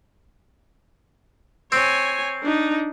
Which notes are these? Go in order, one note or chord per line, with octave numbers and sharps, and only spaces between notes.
C4 C#5 G#5
D4 D#4